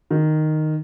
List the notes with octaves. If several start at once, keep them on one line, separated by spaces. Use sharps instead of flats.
D#3